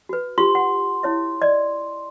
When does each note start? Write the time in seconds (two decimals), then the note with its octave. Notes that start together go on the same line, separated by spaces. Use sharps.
0.09 F#4 B4
0.38 F4 G4 C6
0.55 F#5
1.03 E4 C#5 E5
1.42 D5 D#5